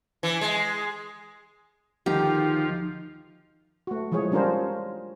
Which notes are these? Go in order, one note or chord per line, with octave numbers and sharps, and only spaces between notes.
E3
G#3
D2 D#3 F3 D#4 G4
A3 F#4
E3 F3 G#3 G#4 C#5
G3 C#4 D4 F4 A#4 C5